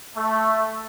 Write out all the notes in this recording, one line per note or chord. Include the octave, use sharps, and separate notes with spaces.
A3